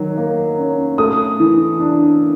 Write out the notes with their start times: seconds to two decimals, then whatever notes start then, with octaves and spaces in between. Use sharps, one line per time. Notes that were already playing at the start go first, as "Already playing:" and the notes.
Already playing: D#3 F#3
0.17 A#3
0.59 C#4
0.98 A3 D#6
1.40 E3
1.80 D4